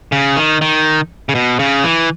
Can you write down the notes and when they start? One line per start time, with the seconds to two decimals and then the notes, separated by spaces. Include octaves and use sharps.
0.12 C#3
0.36 D#3
0.61 D#3
1.29 C#3
1.35 B2
1.59 C#3
1.84 E3